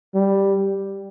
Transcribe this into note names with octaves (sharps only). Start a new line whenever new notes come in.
G3